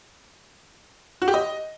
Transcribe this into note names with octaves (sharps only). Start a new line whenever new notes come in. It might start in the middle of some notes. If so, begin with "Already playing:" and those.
F#4
G4
D#5